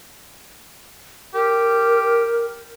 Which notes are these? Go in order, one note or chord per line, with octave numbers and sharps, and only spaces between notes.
G4 A#4